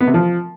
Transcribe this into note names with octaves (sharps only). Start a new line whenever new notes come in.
B3
C3
F3